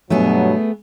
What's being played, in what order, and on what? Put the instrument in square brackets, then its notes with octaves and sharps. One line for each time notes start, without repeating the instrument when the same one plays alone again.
[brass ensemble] G2 B2 F#3 [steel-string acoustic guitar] A3 B3 G#4